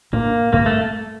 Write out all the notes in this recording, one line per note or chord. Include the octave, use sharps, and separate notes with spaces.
A2 A3 A#3 D4
G2 D3 G3 A#3 C4
A3